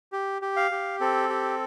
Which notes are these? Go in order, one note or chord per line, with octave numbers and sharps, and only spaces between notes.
G4
G4
F5
G4
C4 A4
G4